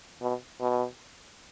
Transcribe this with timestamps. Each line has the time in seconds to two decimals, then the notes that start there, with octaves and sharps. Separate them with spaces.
0.22 B2
0.61 B2